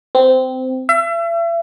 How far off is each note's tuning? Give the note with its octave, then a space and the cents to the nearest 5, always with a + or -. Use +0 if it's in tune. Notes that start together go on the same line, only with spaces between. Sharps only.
C4 -15
E5 +35